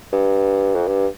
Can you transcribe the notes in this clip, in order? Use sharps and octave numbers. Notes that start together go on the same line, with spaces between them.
G2
F2
G2